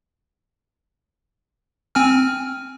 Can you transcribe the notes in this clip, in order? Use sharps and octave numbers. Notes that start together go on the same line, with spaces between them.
C4 G#5 F6